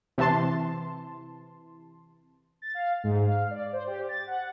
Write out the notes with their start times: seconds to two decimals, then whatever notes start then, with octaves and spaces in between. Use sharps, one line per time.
0.18 C3 E3 A5 C6
2.62 A6
2.74 F5
3.04 G#2
3.25 F5
3.51 D5
3.73 C5
3.87 G4
4.09 A6
4.27 F#5